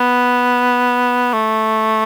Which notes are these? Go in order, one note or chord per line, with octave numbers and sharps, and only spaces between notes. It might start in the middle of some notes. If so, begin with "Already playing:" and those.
Already playing: B3
A3